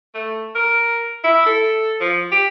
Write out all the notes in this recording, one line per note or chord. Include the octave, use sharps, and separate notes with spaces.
A3
A#4
E4
A4
F3
G4